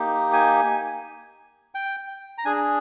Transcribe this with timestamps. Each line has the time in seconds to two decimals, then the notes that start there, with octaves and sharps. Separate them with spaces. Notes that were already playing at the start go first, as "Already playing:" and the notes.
Already playing: A#3 D#4 G4
0.33 G#5
1.75 G5
2.38 A#5
2.45 D4 G#4 G#5